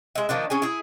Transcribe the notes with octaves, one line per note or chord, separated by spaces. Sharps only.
G#3 E5
D#3 F3 A#3 D4
C#4 G#4 G#5
E4 G#4